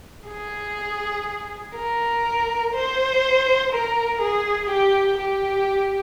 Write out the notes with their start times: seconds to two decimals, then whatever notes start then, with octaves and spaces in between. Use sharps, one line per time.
0.28 G#4
1.76 A#4
2.74 C5
3.72 A#4
4.21 G#4
4.69 G4
5.19 G4